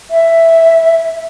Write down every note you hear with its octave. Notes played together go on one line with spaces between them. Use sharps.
E5